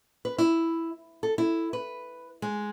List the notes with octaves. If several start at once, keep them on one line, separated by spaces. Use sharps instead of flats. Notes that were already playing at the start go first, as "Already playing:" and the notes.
B4
E4
A4
E4
B4
G#3